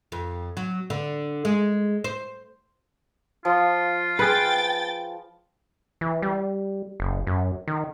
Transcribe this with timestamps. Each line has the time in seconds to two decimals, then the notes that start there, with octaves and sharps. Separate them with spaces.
0.12 F2
0.57 F#3
0.90 D3
1.45 G#3
2.04 C5
3.45 F3 F4
4.19 G#4 B4 G5 A6
6.01 E3
6.22 G3
7.00 F#1
7.27 F#2
7.68 D#3